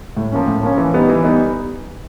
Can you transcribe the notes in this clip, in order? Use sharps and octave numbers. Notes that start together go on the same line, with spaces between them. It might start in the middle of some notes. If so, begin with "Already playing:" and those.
A2
F3 A#3 C#4
A2
F3 A#3 C#4
E3
G3 B3 D#4
E3
G3 B3 D#4